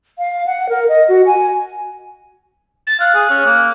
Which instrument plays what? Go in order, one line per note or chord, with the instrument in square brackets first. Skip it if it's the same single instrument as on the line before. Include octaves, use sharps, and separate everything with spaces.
[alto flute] F5
F#5
A#4
D#5
F#4
G#5
[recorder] A6
[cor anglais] F5 [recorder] F#6
[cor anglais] G#4
C#4
A#3